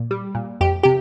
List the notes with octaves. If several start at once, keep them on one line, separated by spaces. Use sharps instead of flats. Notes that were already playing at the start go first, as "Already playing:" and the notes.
Already playing: A#2
G3
A#2
F2 G4
C3 G4